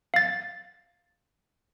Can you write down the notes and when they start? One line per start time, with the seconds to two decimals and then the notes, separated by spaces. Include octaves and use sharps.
0.14 F5 A6